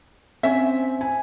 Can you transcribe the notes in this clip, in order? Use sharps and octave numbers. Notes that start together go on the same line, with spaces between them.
C4 C#4 E5
G#5